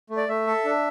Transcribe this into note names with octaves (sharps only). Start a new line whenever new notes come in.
A3
D5
A3 E5
A4
D4